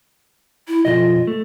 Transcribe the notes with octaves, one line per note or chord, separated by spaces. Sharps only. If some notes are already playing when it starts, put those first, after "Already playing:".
E4
F2 B2 F4 D#5
A3